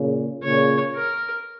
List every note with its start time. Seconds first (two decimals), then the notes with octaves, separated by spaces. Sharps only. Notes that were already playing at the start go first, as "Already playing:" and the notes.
Already playing: A#2 C#3
0.43 A#2 C#3 C#5
0.95 A#4